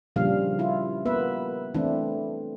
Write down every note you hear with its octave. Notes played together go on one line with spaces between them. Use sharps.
A#2 C#3 F3 G3 D4 F5
E4 F4
A#3 B3 B4 E5
E3 A3 C4 D4 E4